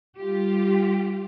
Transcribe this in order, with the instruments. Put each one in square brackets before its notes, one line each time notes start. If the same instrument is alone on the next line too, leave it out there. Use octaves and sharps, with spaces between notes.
[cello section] G3 F4 G4